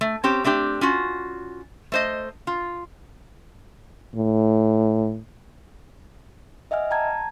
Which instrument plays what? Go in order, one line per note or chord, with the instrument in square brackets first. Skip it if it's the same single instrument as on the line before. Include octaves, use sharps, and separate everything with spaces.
[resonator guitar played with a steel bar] A3
C4 C#4 G4
A3 C4 D4 G4
C#4 F4 F#4
A3 C5 D#5
F4
[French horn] A2
[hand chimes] D#5 E5 F#5 G#5 F6
G5 A5 A#5 G#6